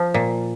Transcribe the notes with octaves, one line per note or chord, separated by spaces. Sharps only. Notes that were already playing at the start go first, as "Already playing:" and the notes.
Already playing: F3
A#2